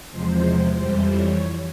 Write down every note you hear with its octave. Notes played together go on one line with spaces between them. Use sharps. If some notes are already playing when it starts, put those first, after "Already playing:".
E2 C3 F3 G#3 C5
F2 E3 G3
C#5